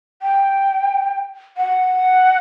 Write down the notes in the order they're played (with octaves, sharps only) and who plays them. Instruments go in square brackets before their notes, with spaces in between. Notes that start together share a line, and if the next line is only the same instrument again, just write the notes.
[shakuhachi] G5
F#5